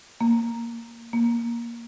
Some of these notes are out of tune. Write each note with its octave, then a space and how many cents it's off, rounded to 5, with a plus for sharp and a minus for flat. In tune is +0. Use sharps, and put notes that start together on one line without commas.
A#3 -10
A#3 +5